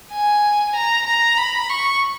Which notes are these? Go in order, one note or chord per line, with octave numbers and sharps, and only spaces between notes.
G#5
A#5
A#5
B5
C#6